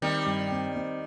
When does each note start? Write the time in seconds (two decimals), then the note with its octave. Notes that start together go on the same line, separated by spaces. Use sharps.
0.02 D#3 G3 C4
0.26 G2
0.51 C4
0.76 C4